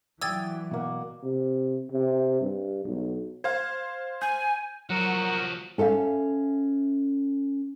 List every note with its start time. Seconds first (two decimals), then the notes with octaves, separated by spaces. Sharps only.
0.22 E3 F#3 D5 G5 D#6 E6 G#6 A6
0.71 B2 A#3 F#5
1.23 C3
1.92 C3
2.41 G2
2.85 B1
3.44 C5 F5 G#6
4.22 G#5 G6
4.90 F3 F#3 F#4 A#4 F#5
5.78 C#4 A4 E5 F5